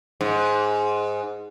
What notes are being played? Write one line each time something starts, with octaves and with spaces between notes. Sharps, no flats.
G#2